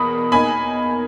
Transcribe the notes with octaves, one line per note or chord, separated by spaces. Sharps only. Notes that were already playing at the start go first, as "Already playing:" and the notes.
Already playing: E2 B2 A#3 B5 D#6
B2 A#3 D#4 G#5 B5